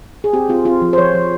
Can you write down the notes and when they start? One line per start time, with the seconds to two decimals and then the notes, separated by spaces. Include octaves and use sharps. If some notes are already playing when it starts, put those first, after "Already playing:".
0.24 G#4
0.33 C4 G4
0.49 C4 F4
0.65 C4 F4
0.82 F3
0.93 C5
0.98 F3 C#5
1.14 F3